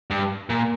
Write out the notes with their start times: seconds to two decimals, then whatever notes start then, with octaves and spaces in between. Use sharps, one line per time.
0.10 G2
0.50 A#2